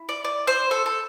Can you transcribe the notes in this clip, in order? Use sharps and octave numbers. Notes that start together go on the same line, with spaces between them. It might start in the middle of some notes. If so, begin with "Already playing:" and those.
Already playing: E4
D5
D5
C5
A4
A4